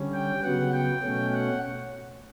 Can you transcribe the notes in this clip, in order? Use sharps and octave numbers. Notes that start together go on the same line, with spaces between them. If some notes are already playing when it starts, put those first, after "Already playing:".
Already playing: D3 G3 C#4
G5
C#3 F#3 B3 F#5
G5
B2 A3 C#4
F#5